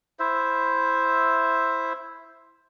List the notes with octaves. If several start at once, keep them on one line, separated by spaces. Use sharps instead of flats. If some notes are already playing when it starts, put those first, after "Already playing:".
E4 C5 E5